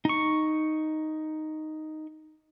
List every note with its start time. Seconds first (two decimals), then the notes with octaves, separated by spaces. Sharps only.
0.05 D#4 C#6